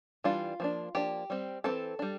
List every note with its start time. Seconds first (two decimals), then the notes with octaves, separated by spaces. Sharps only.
0.24 E3 G3 D4 F4
0.60 F3 A#3 D4
0.95 F3 A#3 D4 G4
1.30 G3 C4
1.64 A3 C4 A4
1.68 E3
1.99 G3 D4